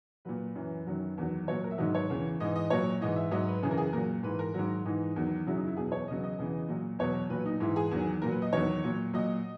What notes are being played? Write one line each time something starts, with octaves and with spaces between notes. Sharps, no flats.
A#2 F#3 B4
F#2 E3
F#2 D#3 F#3
E2 D#3 F#3
A#2 F#3 C#5
A#4
E5
G#2 D#3 F#3 D#5
C#5
E2 C#3 E3
G#2 E3 D#5
D#5
A#2 F#3 C#5
G#2 E3 D#5
E5
G#2 F#3 D#5
B4
F#2 C#3 E3 G#4
A#4
G#4
A#2 F#3 A#4
G#2 E3 B4
A#4
G#2 D#3 F#3
G#2 E3 D#4
E2 D#3 F#3
F#2 C#3 F#3 E4
D#4
E4
E2 B2 F#3 G#4
C#5
E2 C#3 F#3 D#5
D#5
E2 C#3 E3
A#2 F#3
E2 B2 F#3 C#5
A#2 F#3 B4
D#4
G#2 E3 E4
G#4
E2 D#3 F#3
A#2 F#3 A#4
B4
D#5
E2 D#3 F#3 C#5
A#2 F#3
A#2 F#3 D#5